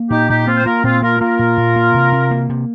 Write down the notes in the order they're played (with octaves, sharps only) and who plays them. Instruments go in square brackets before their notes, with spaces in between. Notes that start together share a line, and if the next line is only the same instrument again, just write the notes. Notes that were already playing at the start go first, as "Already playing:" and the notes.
Already playing: [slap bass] A#3
[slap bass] A#2 [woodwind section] D#4 G4
[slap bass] A#2 [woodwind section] D#4 G4
[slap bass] A#3 [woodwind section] C4 F4
[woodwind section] C5
[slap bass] A#3 [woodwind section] F4 A#4
[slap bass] A#2 [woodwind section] C4 F4
[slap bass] A#3 [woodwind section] F4 A#4
[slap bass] A#3 [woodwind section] F4 A#4
[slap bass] A#2
A#2
A#3
C3
C3
A#3
C3